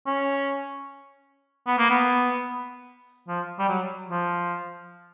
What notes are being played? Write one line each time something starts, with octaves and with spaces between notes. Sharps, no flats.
C#4
B3
A#3
B3
F3
G3
F#3
F3